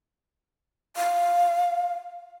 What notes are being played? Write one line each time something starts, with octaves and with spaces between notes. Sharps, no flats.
F5